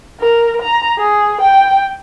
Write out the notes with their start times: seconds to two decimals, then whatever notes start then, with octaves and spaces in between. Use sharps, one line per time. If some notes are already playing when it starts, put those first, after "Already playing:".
0.21 A#4
0.62 A#5
0.98 G#4
1.41 G5